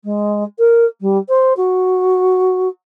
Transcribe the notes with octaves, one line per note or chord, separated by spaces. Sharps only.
G#3
A#4
G3
C5
F#4